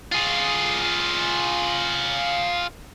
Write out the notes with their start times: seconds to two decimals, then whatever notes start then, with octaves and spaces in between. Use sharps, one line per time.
0.12 F4 G#4